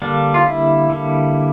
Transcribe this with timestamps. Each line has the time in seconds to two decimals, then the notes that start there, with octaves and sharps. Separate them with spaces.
0.02 D3 G3 A#3 D4
0.34 F4
0.46 E4
0.90 D3 G3 A#3